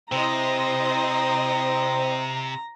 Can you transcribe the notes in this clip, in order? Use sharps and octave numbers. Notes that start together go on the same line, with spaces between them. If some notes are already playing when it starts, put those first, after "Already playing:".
C3 C4 E4 C5 D#5 A#5